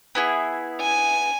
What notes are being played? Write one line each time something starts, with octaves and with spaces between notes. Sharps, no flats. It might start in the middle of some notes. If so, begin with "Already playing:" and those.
B3 E4 G#4
G#5